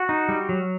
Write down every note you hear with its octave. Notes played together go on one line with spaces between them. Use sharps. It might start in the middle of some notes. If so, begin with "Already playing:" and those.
Already playing: F#4
D#4
G3
F#3